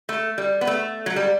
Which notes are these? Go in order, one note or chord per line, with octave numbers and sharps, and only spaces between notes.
A3
G3
B3
A3
F#3
G3